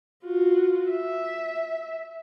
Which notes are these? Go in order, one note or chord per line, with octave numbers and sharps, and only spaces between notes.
F4 F#4
E5